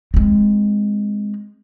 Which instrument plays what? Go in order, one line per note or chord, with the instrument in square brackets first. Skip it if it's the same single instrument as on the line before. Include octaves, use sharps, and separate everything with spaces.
[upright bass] G#3 C4